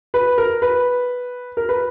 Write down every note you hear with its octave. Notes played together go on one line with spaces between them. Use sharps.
B4
A#4
B4
A#4
B4